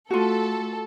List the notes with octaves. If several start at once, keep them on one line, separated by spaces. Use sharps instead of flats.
A3 F4 F#4 A4